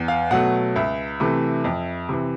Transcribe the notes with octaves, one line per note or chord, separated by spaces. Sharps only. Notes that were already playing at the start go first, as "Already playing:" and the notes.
Already playing: E2
F5
B2 F#3 A3 F#5
C#2 E5
C3 E3 A3
F2
C3 E3